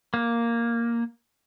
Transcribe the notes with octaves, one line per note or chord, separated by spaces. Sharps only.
A#3